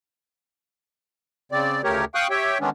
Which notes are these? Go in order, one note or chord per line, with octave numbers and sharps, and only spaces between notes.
C#3 C4 D5
D2 C#3 A3 G4 A#4 C#5
F5 G5 C#6 D#6 F#6
G4 C#5 E5 G5
D3 D#3 G#3 B3 C#4 D4